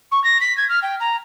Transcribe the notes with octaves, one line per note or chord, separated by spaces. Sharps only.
C#6
A#6
B6
G#6
F6
G5
A#5